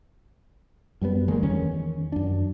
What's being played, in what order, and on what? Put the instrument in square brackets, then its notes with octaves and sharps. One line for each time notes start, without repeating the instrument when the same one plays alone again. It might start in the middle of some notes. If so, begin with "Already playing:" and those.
[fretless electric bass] F#2 G3 A3 B3
D#3 G3 G#3 A#3
E2 D#3 C#4
F#2 D4